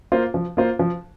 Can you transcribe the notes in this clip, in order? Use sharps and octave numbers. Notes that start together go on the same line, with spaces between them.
A#3 F4 C5
F3
A#3 F4 C5
F3